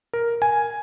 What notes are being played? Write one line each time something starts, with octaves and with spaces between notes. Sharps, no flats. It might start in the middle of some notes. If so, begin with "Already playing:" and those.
A#4
G#5